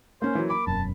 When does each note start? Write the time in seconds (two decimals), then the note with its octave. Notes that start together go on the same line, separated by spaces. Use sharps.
0.22 A#3 C#4 C5 G#5
0.35 E3 F#3 A#3
0.50 B5 D6
0.67 E1 F#2 A5